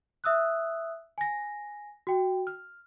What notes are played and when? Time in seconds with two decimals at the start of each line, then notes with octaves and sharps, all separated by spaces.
0.24 E5 D#6 E6 F#6
1.18 G#5 A#6
2.07 F#4 G5
2.47 F6